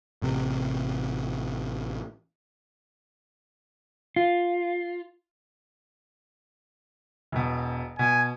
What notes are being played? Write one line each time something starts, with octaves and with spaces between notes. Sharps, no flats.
A1 C3
F4
E1 B2
B2 G#5